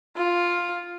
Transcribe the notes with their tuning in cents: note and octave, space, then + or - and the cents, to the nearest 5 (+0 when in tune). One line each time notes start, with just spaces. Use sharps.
F4 +5